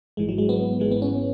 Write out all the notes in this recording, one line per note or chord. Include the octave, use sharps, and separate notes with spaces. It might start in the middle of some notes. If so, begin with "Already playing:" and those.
G#1 G#2 E3 G#3
F#3
G#3
B3
G#1 G#2 E3 G#3
B3
C#4